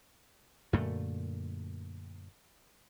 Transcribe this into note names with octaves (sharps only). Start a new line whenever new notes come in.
F#2 A#2 D3 A3